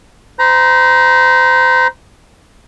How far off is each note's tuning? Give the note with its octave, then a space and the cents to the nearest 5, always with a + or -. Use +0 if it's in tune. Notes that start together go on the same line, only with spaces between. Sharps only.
C5 -30 A#5 +20